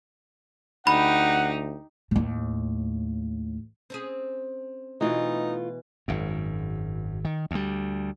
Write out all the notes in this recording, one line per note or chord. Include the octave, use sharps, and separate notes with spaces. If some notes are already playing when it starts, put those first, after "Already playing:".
D2 D#4 G4 F#5 B5
D#2 A2
C4 C#4 G#4
B2 E3 A3 D#4 F4
G#1 F#2
D#3
D2 G3